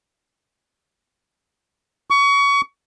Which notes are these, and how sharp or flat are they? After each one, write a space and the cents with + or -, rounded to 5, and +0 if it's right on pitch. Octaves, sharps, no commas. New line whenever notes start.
C#6 +25